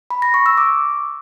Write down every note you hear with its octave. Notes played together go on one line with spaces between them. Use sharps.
B5
A#6
C#6
E6
D6